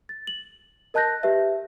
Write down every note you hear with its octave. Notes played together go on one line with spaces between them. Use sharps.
A6
F#7
A#4 D#5 A5 F#6 G6 A#6
G4 B4 E5